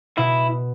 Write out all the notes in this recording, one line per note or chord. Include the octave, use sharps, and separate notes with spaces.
B2 E4